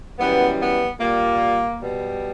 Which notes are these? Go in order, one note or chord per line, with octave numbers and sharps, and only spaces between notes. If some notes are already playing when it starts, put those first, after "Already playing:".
F#2 E3 G3 B3
B3
A#2 G3 A#3
B2 G3